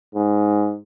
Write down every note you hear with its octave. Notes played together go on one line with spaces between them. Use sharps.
G#2